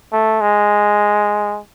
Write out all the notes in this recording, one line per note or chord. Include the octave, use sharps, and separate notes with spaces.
A3
G#3